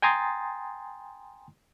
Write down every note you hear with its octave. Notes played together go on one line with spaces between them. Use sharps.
G5 G#5 A#5 C6 D#6 A6